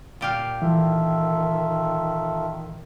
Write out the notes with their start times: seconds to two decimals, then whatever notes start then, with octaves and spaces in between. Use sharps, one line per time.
0.21 A#2 G4 F5
0.62 D#3 E3 F4 A4 E5